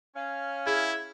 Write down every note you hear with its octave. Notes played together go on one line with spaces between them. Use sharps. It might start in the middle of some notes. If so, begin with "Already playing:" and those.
C#4 F5
E4 G#4 G#6